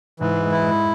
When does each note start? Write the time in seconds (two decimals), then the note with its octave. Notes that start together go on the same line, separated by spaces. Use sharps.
0.20 G#2 E3
0.41 G#3
0.51 E4
0.62 G#3